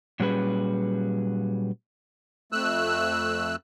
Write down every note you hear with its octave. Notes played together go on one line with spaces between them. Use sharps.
A#2 F#3 G3 C#4 G#4 B4
F2 A3 E6 F#6